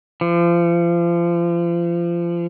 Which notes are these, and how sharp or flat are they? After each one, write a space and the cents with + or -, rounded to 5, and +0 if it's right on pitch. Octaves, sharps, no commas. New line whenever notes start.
F3 -35